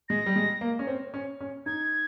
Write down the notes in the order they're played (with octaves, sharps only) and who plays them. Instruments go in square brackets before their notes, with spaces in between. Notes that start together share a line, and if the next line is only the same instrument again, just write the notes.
[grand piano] G#3 [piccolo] A#6
[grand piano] G3
G#3
A#3
C#4
C4
C#4
C#4
[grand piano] D#4 [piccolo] G#6